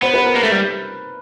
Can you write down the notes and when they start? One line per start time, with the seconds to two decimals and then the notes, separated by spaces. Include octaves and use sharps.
0.02 B3 C5
0.14 B4
0.24 A#4
0.35 A#3 A#4
0.43 A3
0.51 G3